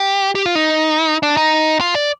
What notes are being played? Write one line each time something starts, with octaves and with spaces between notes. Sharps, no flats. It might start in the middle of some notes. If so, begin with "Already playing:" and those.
Already playing: G4
G4
F4
D#4
D4
D#4
F4
D5